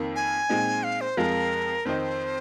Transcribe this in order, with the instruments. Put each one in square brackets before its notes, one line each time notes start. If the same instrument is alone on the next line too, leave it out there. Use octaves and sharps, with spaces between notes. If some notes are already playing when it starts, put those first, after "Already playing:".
Already playing: [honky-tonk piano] F2 D#3 A#3
[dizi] G#5
[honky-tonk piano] A#2 G#3 C4 D#4
[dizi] F5
C5
[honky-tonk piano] F2 F3 G#3 F4 [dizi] A#4
[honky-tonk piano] F2 D#3 C4 D#4 [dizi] C5